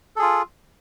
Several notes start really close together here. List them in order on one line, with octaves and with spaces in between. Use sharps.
A4 G#4 F4